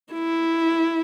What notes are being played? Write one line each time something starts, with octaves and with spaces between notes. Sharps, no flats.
E4